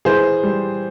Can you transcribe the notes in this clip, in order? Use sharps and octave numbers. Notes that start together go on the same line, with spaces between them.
E3 G#4 C5
G3